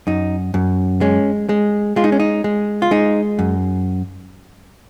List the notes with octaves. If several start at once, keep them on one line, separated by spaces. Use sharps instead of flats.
F#2 D#4
F#2
G#3 C#4
G#3
G#3 F4
D#4
C#4
D#4
G#3
F4
G#3 D#4
F#2